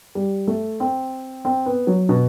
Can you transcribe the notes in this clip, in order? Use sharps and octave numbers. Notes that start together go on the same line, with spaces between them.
G3
A3
C4
C4
B3
F#3
B2